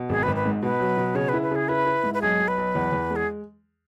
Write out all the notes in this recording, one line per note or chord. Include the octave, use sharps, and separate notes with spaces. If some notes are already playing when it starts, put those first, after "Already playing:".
Already playing: B2
G#1 G#4
B4
G#1
B4
G#2
B2 B4
F#3
B2
C#3 C#5
E4 B4
B4
C#3 G#4
E4 B4
E4
G#2
B4
B1 G#4
B1
B4
B1
E2
E2
G#3
G#4